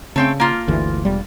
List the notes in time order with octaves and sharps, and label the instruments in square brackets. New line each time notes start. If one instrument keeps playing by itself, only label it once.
[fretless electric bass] C#3 [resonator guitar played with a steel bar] A3 C4 G5
[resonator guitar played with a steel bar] A#3 F4
[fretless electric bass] G1 D2 E3
E1 G3